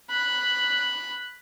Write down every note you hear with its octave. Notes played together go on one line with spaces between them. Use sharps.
B5 F#6